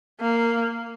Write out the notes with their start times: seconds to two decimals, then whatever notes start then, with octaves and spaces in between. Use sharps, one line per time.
0.21 A#3